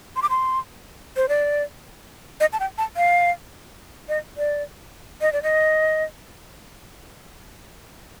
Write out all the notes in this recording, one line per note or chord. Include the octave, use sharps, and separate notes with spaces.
C6
D6
C6
C5
D5
D#5
A5
G5
A5
F5
D#5
D5
D#5
D5
D#5